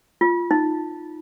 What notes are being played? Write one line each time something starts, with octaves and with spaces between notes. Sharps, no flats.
F4
D#4